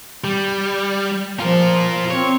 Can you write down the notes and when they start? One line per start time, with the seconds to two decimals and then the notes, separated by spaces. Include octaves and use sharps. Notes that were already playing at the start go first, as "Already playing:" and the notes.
0.24 G3
1.40 F3 F4 A#4
2.11 C4 C#5